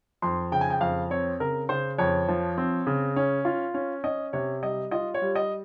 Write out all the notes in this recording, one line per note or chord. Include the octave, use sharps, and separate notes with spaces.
F2 C6
C#3 G5
G#5
G5
F2 F5
C4 C#5
C#3 A#4
C#3 C5
F2 C#5
F3
C4
C#3
C#4
F4
C#4
C#4 D#5
C3 C#5
G3 D#5
F4 D#5
C#5
G3
D#5